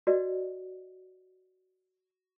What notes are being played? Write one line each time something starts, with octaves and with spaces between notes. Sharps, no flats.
F#4 B4 D5 D#5